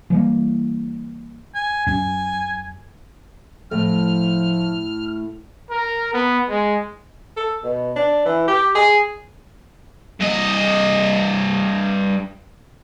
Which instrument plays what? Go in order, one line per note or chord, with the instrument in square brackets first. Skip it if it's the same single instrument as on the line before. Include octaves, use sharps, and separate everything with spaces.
[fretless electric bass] E3 G3 A#3
[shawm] G#5
[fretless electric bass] F#2 [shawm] G#5
[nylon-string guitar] A2 [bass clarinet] F3 [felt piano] A3 [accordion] F6
[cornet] A#4
B3
G#3
[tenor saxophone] A4
B2
D4
E3
G4
G#4
[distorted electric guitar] G2 D#5